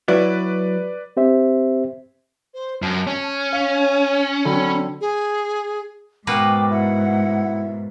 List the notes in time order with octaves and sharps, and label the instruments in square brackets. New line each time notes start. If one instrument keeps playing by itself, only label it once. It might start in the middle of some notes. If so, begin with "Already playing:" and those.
[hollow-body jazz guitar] F#3 E4 F#4 [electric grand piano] B4 D5
[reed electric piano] C4 G4 C5 E5
[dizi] C5
[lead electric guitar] F#2 [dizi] A5
[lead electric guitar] C#4
[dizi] C#5 [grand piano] F5
[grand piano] D3 F#3 C4 [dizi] B5
[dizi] G#4
[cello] G#2 [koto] B2 A#3 B4 [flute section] G5 D6
[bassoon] E4 [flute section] F#5